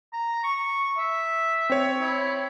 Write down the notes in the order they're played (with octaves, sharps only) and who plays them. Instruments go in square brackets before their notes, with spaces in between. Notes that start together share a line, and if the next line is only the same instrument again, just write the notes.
[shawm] A#5
C#6
E5
[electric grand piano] C4 C#5
[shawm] E4